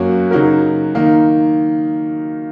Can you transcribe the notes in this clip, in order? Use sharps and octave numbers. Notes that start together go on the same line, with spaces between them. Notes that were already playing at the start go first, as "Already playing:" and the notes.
Already playing: F#2 F#3 A#3 F#4 C#5
C#3 F#3 D#4 F#4 A#4
D#3 A#3 D#4